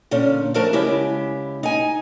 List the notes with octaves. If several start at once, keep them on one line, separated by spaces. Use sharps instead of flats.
A#2 D3 C#4
F3 A3 F#4 A#4 A5
C#3 G#3 E4 G4
D#4 G#5